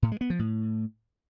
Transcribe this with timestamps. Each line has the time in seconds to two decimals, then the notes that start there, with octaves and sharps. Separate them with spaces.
0.02 A2
0.12 G#3
0.21 B3
0.30 F3
0.39 A2